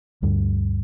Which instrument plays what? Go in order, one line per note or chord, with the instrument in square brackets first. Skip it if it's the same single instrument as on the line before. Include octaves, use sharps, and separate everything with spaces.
[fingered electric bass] D2 G2 D3 G3